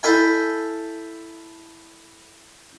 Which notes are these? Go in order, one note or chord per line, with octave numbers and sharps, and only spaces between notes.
E4 A4 E5 F5 G5 G#5